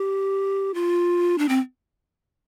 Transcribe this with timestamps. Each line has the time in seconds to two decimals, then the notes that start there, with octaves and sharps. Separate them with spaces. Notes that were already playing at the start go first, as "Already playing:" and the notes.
Already playing: G4
0.74 F4
1.38 D4
1.49 C4